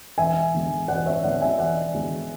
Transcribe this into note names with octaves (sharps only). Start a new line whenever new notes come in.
E1 E5 G#5
E2 D3 G#3
E1 D5 F#5
C#5 E5
E2 D3 G#3 D5 F#5
E5 G#5
E1 D5 F#5
E2 D3 G#3